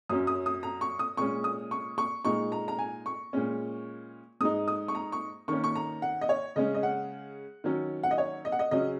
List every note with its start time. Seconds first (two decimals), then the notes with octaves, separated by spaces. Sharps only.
0.09 F#2 F#3 C#4 D#6
0.27 D#6
0.46 D#6
0.63 A#5
0.81 C#6
0.99 D#6
1.17 A#2 G#3 C#4 C#6
1.44 D#6
1.71 C#6
1.98 C#6
2.25 A#2 G#3 D#4 C#6
2.52 A#5
2.68 A#5
2.79 G#5
3.06 C#6
3.33 A#2 G#3 C#4
4.41 G#2 G#3 D#4 D#6
4.68 D#6
4.88 C#6
4.95 A#5
5.12 C#6
5.48 D#3 A#3 C#4 C#6
5.64 C#6
5.75 A#5
6.02 F#5
6.21 D#5
6.29 C#5
6.56 C#3 G#3 C#4 D#5
6.75 D#5
6.83 F#5
7.64 D#3 F#3 C#4
8.03 F#5
8.11 D#5
8.18 C#5
8.45 D#5
8.52 F#5
8.59 D#5
8.71 C#3 F#3 C#4 D#5